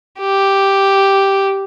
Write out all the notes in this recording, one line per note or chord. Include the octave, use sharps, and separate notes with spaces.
G4